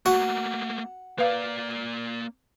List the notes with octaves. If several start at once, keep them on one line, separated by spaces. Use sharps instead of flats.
A3 A#3 F#4 F#5
A#3 B4 D5 F5